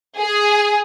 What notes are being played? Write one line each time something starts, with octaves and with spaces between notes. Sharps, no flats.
G#4